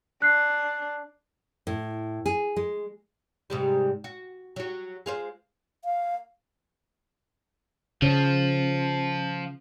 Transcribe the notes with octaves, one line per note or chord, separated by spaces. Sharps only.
D4 F#6 C7
A2
G#4
G#3
G#2 C3 G3
F#4
F#3 F#4
G#3 F4 C5
F5
C#3 F3